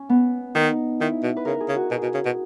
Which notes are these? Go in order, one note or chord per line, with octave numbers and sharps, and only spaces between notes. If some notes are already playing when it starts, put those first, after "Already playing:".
Already playing: C#4
B3
D#3 D#4
D#3 E4
B2
B4
C#3 A#4
G#4
C#3
F#4
B2 G#4
B2
C#3
B2